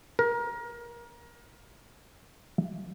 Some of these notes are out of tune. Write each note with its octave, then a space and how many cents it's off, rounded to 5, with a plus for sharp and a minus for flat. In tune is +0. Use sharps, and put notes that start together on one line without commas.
A#4 +25